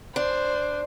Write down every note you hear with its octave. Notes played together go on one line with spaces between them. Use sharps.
D4 C5